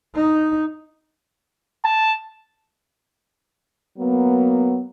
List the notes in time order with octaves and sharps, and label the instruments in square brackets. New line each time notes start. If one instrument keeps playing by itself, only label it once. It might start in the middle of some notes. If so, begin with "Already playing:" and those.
[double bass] D#4
[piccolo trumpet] A5
[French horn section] F#3 A#3 B3